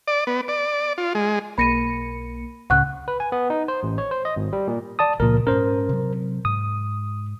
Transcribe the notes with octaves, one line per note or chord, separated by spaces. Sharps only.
D5
B3
D5
F4
G#3
B1 A#3 B5 A#6 C#7 D#7
C#2 A2 C#3 F#5 C#6 F#6
B4
G#5
B3
D#4
C5
A1
C#5
C5
D#5
G#1
G3
A#2
D5 A5 D#6
C#2 A#2 F3 A#4
G#2 C#4 A#4 C5
C3 F#3
G#2 D#6